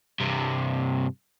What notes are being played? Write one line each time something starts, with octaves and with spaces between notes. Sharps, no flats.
G2 C3